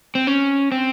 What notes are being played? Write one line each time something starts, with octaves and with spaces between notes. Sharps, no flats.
C4
C#4
C4